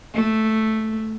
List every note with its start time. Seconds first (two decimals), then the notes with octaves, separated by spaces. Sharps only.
0.14 A3